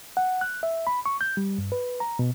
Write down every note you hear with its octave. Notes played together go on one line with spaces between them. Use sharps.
F#5
F#6
E5
B5
C#6
G6
G3
G2
B4
A#5
B2